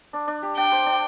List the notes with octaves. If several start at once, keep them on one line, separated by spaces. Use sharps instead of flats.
D4
D4
G4
D4 G5
C5
D4